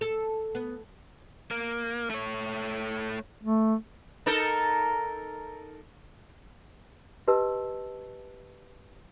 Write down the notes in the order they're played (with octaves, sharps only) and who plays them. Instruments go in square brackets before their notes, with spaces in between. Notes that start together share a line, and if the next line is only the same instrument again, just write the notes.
[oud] A4
B3
[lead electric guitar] A#3
A3 C#5
[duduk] A3
[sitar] D#4 A4 A#4
[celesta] G4 B4 D#5 A5 E6